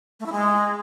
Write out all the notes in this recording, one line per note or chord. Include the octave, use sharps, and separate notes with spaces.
A3
E4
G#3